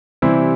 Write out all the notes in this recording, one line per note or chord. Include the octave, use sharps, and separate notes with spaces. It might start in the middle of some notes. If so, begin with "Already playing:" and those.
C3 E3 G3 C4 E4